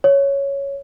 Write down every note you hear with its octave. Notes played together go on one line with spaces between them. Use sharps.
C#5